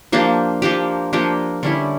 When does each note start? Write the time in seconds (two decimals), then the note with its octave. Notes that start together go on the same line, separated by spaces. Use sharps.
0.12 F3 A#3 D4 G4
0.62 F3 A#3 D4 G4
1.13 F3 A#3 D4 G4
1.63 D3 G3 C#4 E4